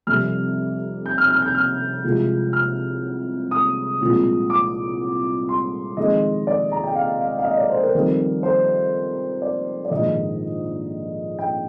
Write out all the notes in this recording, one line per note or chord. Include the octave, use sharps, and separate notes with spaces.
F1 F2 C3 G3 F6
G6
F6
F6
G6
F6
C2 C3 F3 G#3
F6
D#6
C2 A#2 F3 G#3
D6
C6
F2 D#3 G#3 D#5
D5
A#5
G5
F5
F5
F5
D#5
D5
C5
A#4
F2 D#3 G3
C5
D5
D5
A#1 G#2 D#3 D#5
G5